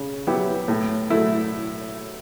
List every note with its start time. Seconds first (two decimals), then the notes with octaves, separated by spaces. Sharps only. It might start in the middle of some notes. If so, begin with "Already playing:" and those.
Already playing: C#3
0.27 F#3 B3 E4 G4
0.68 A2
1.10 F#3 A3 E4